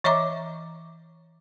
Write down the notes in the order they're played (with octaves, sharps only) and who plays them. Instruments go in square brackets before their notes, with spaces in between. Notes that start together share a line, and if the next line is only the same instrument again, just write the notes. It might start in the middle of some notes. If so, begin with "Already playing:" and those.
[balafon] E3 C#5 D#5 E5 A#5 D6